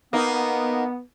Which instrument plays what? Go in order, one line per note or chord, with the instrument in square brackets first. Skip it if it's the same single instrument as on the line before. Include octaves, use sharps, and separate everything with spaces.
[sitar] A#3 D#4 [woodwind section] B3